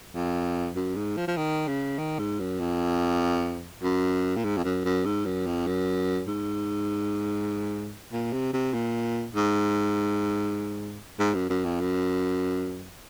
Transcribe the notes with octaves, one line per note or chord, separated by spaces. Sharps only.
F2
F#2
G#2
F3
F3
D#3
C#3
D#3
G#2
F#2
F2
F#2
A#2
G#2
F2
F#2
F#2
G#2
F#2
F2
F#2
G#2
A#2
C3
C3
A#2
G#2
G#2
F#2
F#2
F2
F#2